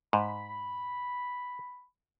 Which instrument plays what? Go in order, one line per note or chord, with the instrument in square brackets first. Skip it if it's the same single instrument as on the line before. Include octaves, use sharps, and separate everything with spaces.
[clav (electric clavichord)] G#2 [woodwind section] B5